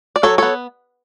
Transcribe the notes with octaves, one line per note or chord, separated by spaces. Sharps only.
D5
F#3 A4 C#5
B3 A4 C#5